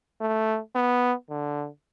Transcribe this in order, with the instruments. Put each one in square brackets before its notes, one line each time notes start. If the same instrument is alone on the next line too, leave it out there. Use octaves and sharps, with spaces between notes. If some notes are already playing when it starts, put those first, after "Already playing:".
[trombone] A3
B3
D3